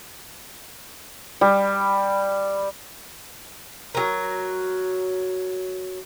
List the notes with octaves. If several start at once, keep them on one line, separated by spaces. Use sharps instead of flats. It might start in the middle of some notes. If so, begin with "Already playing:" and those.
G3
F#3 A#4